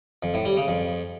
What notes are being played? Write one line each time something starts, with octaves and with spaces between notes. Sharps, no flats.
F2
A2
G3
C#3
F2